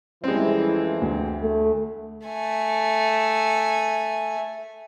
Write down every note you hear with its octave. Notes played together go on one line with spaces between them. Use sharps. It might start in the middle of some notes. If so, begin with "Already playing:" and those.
F2 E3 G3 G#3 C4 C#4 E4
D2
A3
A3 G#5